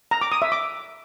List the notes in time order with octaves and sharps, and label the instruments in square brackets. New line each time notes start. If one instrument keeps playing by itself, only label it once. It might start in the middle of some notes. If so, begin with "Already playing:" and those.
[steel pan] A#5
D6
D#6
E5
D6